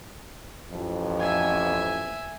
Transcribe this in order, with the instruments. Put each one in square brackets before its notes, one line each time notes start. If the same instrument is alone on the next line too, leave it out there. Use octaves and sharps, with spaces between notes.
[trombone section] A1 F2
[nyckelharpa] E5 G#5